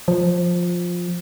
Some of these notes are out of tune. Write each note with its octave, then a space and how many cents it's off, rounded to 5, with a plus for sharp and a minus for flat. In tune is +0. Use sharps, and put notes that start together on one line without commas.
F3 +10